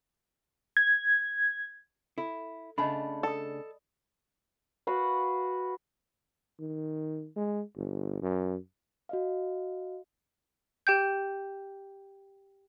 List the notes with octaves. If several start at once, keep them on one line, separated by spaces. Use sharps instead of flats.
G#6
E4 A4
C#3 A3 D4 D#5 A5 B5
A4 D5 D#6
F#4 B4 F5 F#5
D#3
G#3
G1
F#2
F#4 D#5 F5
G4 G5 G6